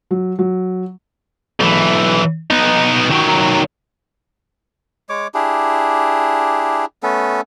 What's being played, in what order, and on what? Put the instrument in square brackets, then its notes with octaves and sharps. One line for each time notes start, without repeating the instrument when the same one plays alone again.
[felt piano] F#3
F#3
[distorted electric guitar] B1 E3
B3 D#4
D#3 F#3
[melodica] G#3 C#5 D6
D4 E4 G4 G#4
A3 B3 C#4 A4